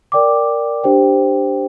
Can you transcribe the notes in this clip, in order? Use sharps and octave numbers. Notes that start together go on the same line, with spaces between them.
A#4 D5 G5 D6
D4 G4 C5 G5